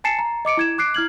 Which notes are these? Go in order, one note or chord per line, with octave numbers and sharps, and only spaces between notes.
G#5 A5 A6 C7 C#7 E7
A#5
D#5 D6 C#7 D7
E4 G#6 E7
D6 F#6 C7 D7
E4 F6 G#6 F#7